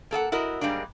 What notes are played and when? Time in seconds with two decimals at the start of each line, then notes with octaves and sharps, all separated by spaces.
0.11 A#3 A4 D#5 F#5
0.32 E4 F#4 A#4 D#5
0.61 G#2 G3 G#3 A#3 D4